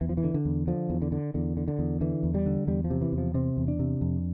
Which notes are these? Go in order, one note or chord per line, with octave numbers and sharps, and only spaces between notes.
E2 E3
F3
E3
D3
D3
E2
D3 F3
E2
D3
D3
E2 D3
D3
D3
E2
D3 E3
E2
G3
D3
E2 G3
F3
C3
E3
E2
F3
C3 C4
E2
D4
C3
F2